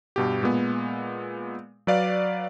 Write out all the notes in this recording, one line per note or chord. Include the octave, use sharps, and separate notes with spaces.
G2 B2 G4
A#2 G#3 B3
F#3 B4 D5 F5